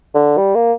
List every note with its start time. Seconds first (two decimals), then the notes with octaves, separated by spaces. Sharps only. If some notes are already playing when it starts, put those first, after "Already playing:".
0.15 D3
0.38 G3
0.55 A#3